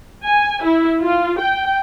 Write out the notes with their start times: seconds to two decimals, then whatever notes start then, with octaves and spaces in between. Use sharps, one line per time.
0.23 G#5
0.64 E4
1.01 F4
1.39 G5